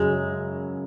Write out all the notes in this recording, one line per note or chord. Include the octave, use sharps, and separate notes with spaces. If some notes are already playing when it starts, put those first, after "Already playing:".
Already playing: F#2 C#3 F#3 G#3